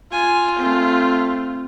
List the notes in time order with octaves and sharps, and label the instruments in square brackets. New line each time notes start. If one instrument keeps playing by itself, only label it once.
[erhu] F4 [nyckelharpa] G#5
[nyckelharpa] A3 C4